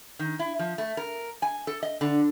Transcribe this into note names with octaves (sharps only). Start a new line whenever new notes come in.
D#3
E4
F3
A3
A#4
G#5
A4
D#5
D3